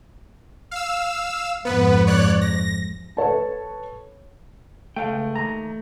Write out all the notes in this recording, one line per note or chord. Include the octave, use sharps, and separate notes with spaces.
F5 E6
F2 G#2 B3 B4
C#5 D5 F#6
A#6
A4 B4 C#5 A5
C#2 A3 F5 G5
D#2 A#5